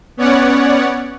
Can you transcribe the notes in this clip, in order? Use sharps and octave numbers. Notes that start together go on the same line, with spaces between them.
B3 C#4 C#5 D5 F#5